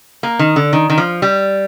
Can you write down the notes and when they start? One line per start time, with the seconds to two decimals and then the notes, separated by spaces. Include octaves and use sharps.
0.23 A#3
0.39 D#3
0.56 D3
0.73 D#3
0.90 D#3
0.98 F3
1.22 G3